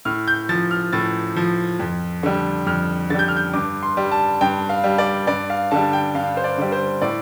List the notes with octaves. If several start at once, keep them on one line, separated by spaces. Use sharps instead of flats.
A2 F6
G6
F3 A6
F6
A2 A6
F3
F2
D3 G3
F2 F6
D3 G3 G6 A6
F6
G6
G2 D6
C6
G3
A5
G2 G5
F5
G3
D5
G2 D5
F5
D3 G3 A5
G5
G2 F5
C5
D5
D3 G3
C5
A2 D5